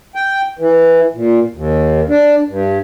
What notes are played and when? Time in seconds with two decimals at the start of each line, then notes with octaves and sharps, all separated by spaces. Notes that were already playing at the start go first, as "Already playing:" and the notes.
0.15 G5
0.59 E3
1.15 A#2
1.54 D#2
2.09 D4
2.48 G2